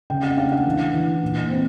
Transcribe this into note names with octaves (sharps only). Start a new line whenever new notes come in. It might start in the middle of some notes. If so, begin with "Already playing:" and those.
C#3 G5
F#5
D4 F5
F#5
E3
E3
A#2
C4